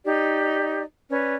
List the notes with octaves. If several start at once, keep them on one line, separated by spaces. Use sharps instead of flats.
D#4 G4 D5
C#4 B4 D5